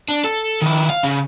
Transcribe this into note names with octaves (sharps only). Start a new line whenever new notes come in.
D4
A4
D#3 E4
F5
C#3